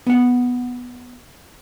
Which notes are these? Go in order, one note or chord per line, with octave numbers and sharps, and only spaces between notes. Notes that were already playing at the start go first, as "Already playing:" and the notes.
B3 F#5